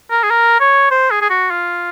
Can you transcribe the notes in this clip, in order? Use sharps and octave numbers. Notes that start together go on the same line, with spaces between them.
A#4
G#4
A#4
C#5
C5
G#4
G#4
F#4
F4